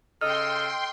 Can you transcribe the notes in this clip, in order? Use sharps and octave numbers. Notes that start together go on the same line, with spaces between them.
C#3 A4 D#5 G5 C6 F6